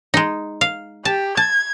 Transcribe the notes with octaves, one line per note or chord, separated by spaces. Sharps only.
G#3 D#4
F5
G4 A5
A5 G#6